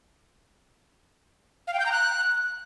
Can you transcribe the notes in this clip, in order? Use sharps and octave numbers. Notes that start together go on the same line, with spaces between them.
F5
G5
G6
A#5
F#6